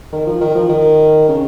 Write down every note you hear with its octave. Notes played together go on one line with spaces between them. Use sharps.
D#3
F3
D#3
F3
D#3
C#3